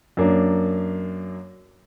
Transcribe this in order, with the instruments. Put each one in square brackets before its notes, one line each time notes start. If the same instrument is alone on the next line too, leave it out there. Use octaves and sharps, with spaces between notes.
[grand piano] F#2 A#3 D4